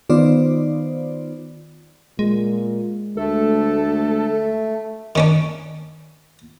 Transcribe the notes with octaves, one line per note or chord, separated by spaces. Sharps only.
D#3 B3 D#4 F4 C5 D5
A#2 G#3
D2 A3 A4
D#3 C#4 D4